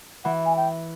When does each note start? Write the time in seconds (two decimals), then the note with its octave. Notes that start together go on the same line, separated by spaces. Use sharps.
0.24 E3 F#5
0.46 G#5
0.57 G5